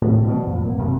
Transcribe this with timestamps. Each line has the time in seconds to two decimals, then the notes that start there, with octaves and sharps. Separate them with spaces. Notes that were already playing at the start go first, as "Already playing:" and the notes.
0.02 A2
0.27 B2 E3 F3 G3
0.47 F2 A#2
0.65 A#3 B3
0.78 F#2 C3 F#3